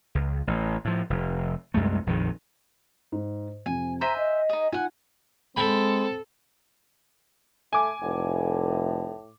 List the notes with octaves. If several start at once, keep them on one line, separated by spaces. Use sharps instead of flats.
C#2
A1
A2 F3
F1
C2 F#2 G#3 A3
A#1 F2 D#3
G#2
F2 C3 G#5
C5 E5 G#5 A#5 A#6 B6 D#7
D#5
D#4 G#4
D#4 F4 F#5 G#5
G#3 C4 A4 G5 B5
A3 G#5 D6
F1 A2